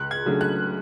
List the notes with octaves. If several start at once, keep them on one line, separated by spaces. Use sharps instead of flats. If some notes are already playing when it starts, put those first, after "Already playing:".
Already playing: C#2 F#6
G#6
C#3 F#3 A3 D4
F#6